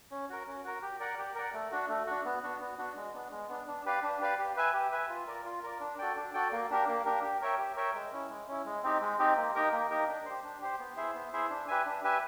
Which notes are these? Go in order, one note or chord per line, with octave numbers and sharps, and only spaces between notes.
C#4
F#4 A#4
C#4
F#4 A#4
G4
A#4 D5 F#5
G4
A#4 D5 F#5
A3
D4 F#4
A3
D4 F#4
B3
D4 F#4
B3
D4 F#4
G#3
B3 D4
G#3
B3 D4
D4
G4 B4 D5 F5
D4
G4 B4 D5 F5
G4
B4 E5 G#5
G4
B4 E5 G#5
F4
A#4 D5
F4
A#4 D5
D4
F#4 A4 D5 G5
D4
F#4 A4 D5 G5
A#3
D4 G4 A#4
A#3
D4 G4 A#4
G4
A#4 C#5 E5 G5
G4
A#4 C#5 E5 G5
G#3
C#4 E4
G#3
C#4 E4
G#3
C4 D#4 G4
G#3
C4 D#4 G4
A#3
D#4 G4 A#4
A#3
D#4 G4 A#4
D4
G4 C5
D4
G4 C5
B3
E4 G#4 C5 E5
B3
E4 G#4 C5 E5
D4
G4 B4 E5 G#5
D4
G4 B4 E5 G#5